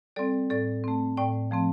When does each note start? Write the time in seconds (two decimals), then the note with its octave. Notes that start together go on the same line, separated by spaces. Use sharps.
0.16 G3 C4 A4 D5
0.50 A2 A4 D5
0.84 A3 C4
1.17 A2 D5 G5
1.51 F3 A3 C4